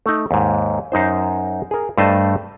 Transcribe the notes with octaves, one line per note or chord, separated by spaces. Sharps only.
A3 D#4
D#2 G#2
F#2 D#4 C5
G#4 A#4
G2 A3 C5 D#5 A5